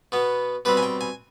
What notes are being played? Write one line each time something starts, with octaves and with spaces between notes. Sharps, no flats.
B2 B3
B2 G3 C4 B4
G#5
G5
G#5